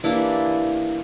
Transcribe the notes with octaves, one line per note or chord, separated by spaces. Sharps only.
E3 G3 A#3 D4 E4